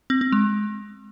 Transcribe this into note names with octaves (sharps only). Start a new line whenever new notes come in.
C4
C4
G#3